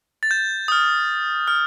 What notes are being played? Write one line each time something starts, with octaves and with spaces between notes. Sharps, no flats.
A6
G6
D#6
F6
F6